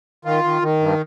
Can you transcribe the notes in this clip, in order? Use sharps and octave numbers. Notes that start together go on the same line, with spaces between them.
D#3 F4
D#3
D#3
G2